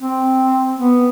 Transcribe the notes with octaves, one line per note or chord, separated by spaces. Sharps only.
C4
B3